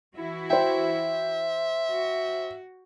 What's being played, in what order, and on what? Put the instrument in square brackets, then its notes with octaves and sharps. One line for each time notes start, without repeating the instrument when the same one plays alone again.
[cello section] E3 E4 F#4
[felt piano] C5 G5 [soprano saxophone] E5
[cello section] F#4